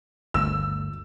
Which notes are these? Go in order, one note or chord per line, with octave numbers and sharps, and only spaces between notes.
G1 D2 E6